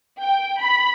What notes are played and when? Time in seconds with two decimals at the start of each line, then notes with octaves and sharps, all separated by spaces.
0.22 G5
0.62 B5